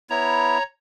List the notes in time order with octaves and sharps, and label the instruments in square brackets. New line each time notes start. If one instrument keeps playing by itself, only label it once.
[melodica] B3 E4 [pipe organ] C#5 A#5